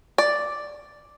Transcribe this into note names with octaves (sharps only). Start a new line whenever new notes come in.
D5